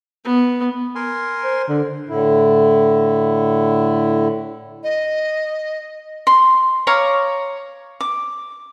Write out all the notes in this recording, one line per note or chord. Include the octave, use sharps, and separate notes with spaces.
B3
A#4 G#5 C6
C5
D3
A2 D3 E4
D#5
C6
C#5 F5 A#5 D6
D6